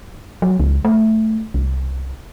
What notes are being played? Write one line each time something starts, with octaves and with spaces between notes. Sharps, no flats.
F#3
C#2
A3
C2